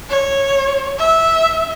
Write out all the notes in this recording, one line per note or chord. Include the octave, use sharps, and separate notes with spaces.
C#5
E5